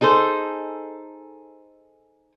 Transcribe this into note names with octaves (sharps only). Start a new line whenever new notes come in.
D#4 G#4 A4 C5